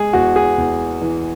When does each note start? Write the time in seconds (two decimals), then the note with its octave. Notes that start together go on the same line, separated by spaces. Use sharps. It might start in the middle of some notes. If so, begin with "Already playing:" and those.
Already playing: G#3 G#4
0.13 E2 F#4
0.36 G#4
0.58 E2
1.02 E3